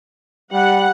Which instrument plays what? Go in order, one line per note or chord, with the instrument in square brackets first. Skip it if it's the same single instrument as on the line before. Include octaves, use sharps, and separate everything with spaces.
[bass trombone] G3 [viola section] F#5